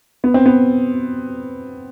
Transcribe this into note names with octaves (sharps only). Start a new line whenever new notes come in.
B3
C4
B3